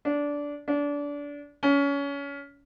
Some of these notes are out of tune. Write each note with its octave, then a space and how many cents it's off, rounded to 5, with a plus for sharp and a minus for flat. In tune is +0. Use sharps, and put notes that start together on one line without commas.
D4 -15
D4 -25
C#4 +25